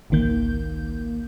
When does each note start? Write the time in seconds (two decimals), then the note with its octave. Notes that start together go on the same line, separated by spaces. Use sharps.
0.10 G#1 C#2 D#3 A#3 G6